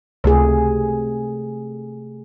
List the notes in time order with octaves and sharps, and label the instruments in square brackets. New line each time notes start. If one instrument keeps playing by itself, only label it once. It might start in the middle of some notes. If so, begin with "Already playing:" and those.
[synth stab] C#2 [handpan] C3 A3 G#4